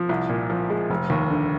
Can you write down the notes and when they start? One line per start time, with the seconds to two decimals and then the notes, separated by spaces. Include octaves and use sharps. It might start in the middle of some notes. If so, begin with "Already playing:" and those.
Already playing: F3
0.09 C2
0.29 A#2
0.50 F3
0.70 G#3
0.90 F1
1.10 D#2
1.30 D3